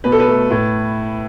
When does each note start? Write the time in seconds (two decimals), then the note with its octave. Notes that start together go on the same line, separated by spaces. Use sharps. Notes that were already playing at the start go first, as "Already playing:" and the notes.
0.04 B2 B4
0.12 A4
0.20 B4
0.27 A3
0.51 A2